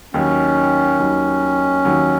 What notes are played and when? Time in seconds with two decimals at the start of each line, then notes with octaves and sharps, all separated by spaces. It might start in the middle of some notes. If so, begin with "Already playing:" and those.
0.14 D#2 D#3 F#3 C#4
0.99 D#2 D#3 F#3
1.85 D#2 D#3 F#3